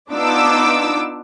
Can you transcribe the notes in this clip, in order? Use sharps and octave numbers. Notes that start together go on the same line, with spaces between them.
B3 D4 D#4 F4 D6 E6